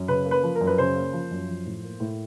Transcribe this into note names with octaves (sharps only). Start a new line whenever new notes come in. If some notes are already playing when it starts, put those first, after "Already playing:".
Already playing: F#2
C#3 B4
A#3
B4
F3
F#2 A#4
B4
C#3 C5
A#3
F3
F#2
F3
A2
A#3
A2